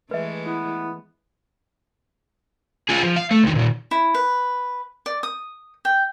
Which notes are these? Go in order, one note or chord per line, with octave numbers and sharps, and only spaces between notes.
E3 G#3 A3 B4 E5
B3 E4
F4 G#4
F3
F5
A3
C#2 D#3
A#2 D#3
E4
B4
D5
D#6
G5